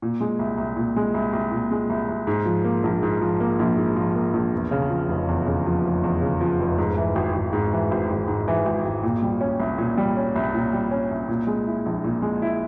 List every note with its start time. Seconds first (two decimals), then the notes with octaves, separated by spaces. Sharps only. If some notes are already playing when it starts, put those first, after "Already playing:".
0.02 A#2
0.21 G#3
0.39 C2
0.58 C2
0.76 A#2
0.96 G#3
1.14 C2
1.33 C2
1.52 A#2
1.71 G#3
1.90 C2
2.09 C2
2.27 G#2
2.46 F3
2.64 A#3
2.84 A#1
3.03 G#2
3.21 F3
3.40 A#3
3.59 A#1
3.77 G#2
3.96 F3
4.16 A#3
4.33 A#1
4.53 E2
4.71 C#3
4.90 F3
5.08 F1
5.28 E2
5.46 C#3
5.66 F3
5.84 F1
6.04 E2
6.21 C#3
6.41 F3
6.60 F1
6.78 G#2
6.97 E3
7.15 G#1
7.34 G#1
7.53 G#2
7.72 E3
7.91 G#1
8.10 G#1
8.28 G#2
8.48 E3
8.65 G#1
8.85 G#1
9.03 A#2
9.22 G3
9.41 C#4
9.60 C2
9.78 A#2
9.98 G3
10.17 C#4
10.36 C2
10.54 A#2
10.73 G3
10.91 C#4
11.11 C2
11.28 A#2
11.47 G#3
11.67 E4
11.86 A#1
12.04 A#2
12.22 G#3
12.42 E4